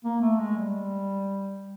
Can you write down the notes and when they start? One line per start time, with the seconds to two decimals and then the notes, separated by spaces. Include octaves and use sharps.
0.04 A#3
0.21 A3
0.39 G#3
0.57 G3